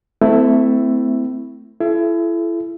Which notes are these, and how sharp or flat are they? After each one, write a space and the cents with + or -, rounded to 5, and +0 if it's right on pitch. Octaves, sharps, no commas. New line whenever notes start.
A3 +5 C4 -35 E4 +0
E4 +35 A4 -40